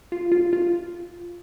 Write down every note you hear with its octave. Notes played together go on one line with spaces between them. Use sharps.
F4
F4
F4